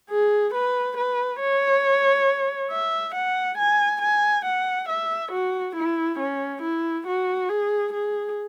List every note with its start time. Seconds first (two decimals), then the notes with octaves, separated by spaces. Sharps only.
0.10 G#4
0.54 B4
0.98 B4
1.41 C#5
2.71 E5
3.15 F#5
3.58 G#5
4.02 G#5
4.46 F#5
4.89 E5
5.32 F#4
5.76 E4
6.19 C#4
6.62 E4
7.07 F#4
7.49 G#4
7.93 G#4